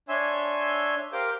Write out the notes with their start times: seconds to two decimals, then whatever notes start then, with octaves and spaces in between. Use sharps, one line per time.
0.09 D4 C#5 E5 G#5 C6 E6
1.13 G4 A#4 C5 F5 D6 G6